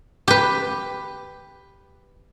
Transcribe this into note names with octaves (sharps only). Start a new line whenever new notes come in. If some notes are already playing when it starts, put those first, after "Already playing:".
G4 B4